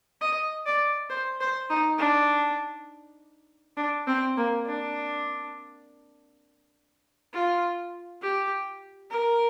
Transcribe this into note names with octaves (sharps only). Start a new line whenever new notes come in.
D#5
D5
C5
C5
D#4
D4
D4
C4
A#3
D4
F4
G4
A#4